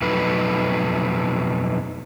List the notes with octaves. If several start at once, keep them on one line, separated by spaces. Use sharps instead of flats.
F2 B2 F#3 A3 D#4 B4